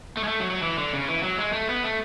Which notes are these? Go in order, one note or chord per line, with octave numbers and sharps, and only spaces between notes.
A3
G#3
A3
F#3
F#3
E3
D3
C#3
E3
F#3
G#3
A3
B3
A3